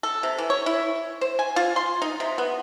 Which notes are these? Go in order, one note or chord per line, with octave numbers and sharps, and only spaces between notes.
A4
C3
E3
C#5
E4
C5
G#5
F4
C6
D#4
C3
B3